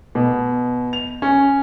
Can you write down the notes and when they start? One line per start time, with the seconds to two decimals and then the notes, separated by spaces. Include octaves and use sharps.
0.15 B2
0.93 F7
1.22 C#4